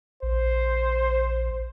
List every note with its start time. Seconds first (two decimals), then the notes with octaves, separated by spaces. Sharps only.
0.23 A#1 C5